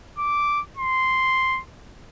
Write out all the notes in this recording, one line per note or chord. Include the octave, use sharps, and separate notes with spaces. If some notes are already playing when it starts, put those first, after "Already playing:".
D6
C6